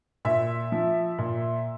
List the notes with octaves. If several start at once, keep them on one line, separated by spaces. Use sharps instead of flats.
A#2 E5
F3
A#2